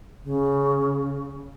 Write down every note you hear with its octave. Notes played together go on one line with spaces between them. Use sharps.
C#3